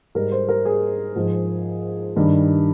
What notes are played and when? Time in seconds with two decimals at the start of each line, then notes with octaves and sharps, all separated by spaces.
0.15 G#2 G3 A#4
0.32 C5
0.49 A#4
0.65 G#4
1.15 G#2 F3
2.16 G2 D#3 G3